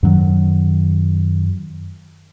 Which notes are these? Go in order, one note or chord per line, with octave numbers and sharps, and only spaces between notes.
F#2 D#3 F#3